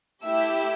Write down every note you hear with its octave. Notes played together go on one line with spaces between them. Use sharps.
A3 E4 G4 E5 E6